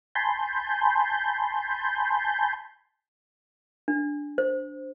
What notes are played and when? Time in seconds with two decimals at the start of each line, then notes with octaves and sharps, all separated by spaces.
0.15 G#5 A5 B5 C6 G6
3.88 D4
4.38 C5